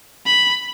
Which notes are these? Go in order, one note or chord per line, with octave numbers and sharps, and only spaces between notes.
B5